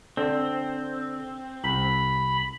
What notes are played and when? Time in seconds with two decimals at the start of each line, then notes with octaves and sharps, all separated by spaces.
0.17 D3 C4
1.64 C2 B5